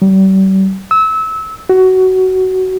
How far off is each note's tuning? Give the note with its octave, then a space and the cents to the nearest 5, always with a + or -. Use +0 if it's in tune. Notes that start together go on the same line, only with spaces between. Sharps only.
G3 -40
E6 -25
F#4 +15